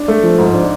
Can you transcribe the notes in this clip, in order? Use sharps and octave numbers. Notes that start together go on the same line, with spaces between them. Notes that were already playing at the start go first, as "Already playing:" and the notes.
Already playing: D4
A3
F3
G#2
D4